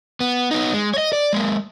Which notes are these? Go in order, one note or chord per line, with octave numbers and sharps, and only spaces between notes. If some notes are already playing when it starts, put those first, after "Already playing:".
B3
B3 D#4
G#3
C#5 D#5
D5
G#3 A#3